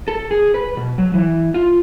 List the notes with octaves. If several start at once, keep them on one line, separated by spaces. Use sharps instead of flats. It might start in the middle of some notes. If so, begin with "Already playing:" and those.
A4
G#4
B4
B2
F#3
E3
F4